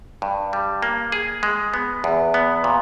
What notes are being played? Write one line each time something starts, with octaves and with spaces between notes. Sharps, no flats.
G2
G3
A#3
G#4
G#3
B3
E2
B3
A#2